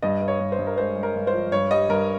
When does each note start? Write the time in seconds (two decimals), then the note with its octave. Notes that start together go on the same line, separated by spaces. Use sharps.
0.02 G2 D#5
0.21 G2
0.28 C#5
0.40 G2
0.52 C5
0.59 G2
0.67 A#4
0.78 G#3 C5
0.96 G#3
1.03 A#4
1.15 G2
1.27 C5
1.33 F3
1.52 G2 C#5
1.71 G3 D#5
1.89 G2 A#4